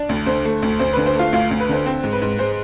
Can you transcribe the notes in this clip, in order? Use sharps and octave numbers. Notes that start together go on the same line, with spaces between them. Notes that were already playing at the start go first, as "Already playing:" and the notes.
Already playing: D4 D5
D2
D3 C5
A3
D2
D2 C5
D3 B4
C5
A3 F4 F5
D2 F4 F5
D2
B4
D3 C5
C4
G#2
B4
G#2
G#3 C5